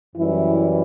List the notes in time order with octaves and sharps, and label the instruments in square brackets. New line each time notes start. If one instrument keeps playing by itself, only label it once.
[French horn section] F#2 E3 G3 E4